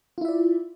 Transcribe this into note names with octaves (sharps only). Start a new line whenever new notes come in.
E4 F4 D5 E5